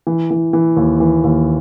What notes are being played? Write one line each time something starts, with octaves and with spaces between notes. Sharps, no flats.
E3
E3
E3
D#2
E3
D#2